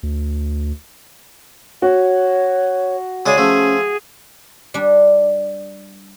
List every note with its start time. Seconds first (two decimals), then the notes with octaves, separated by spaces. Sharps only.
0.03 D2
1.82 F#4 C#5
3.26 C#3 G#3 G#4 D5
3.38 F3 A3 C#4
4.74 G3 D4